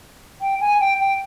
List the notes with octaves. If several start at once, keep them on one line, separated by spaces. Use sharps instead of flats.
G5
G#5
G5
G5